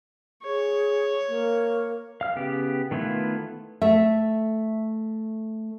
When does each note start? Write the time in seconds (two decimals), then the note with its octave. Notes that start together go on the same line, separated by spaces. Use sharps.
0.44 G#4 C#5
1.28 A#3
2.21 F5 F6
2.36 C#3 B3 G4
2.91 D#3 A3 B3 E4 F4
3.82 A3 E5